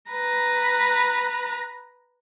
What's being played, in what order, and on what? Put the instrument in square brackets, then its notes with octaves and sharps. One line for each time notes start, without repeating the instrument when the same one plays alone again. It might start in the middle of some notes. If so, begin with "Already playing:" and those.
[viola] B4 A#5